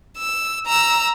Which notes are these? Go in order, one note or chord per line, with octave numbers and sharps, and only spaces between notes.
E6
A#5 E6